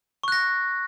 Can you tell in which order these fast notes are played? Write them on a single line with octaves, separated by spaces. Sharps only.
C#6 F#6 A#6